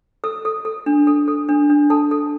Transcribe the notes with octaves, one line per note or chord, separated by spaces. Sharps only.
A4 E6
A4
A4
D4
A4
A4
D4
D4
A4 A5
A4